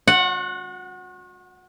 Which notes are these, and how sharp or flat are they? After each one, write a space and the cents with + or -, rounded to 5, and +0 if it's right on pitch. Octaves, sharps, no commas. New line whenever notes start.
F#4 -40 F#5 +0